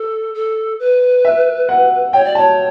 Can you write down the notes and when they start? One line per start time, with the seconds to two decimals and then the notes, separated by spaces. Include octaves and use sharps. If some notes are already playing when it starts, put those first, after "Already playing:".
Already playing: A4
0.34 A4
0.80 B4
1.25 E5
1.69 F#5
2.13 C#5 G5
2.25 D5
2.35 C#5 A5